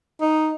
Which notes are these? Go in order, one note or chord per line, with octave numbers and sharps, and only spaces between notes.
D#4